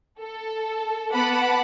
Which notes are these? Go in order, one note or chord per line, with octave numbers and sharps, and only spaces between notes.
A4
B3 F#5 A5 B5 D6